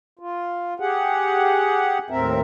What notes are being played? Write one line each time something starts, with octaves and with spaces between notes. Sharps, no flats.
F4
G4 G#4 F#5
D#2 A2 C4 A#4 E5